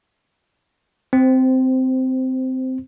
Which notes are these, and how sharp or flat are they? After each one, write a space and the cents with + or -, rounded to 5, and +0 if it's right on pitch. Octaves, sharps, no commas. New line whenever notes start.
C4 -15 C5 +0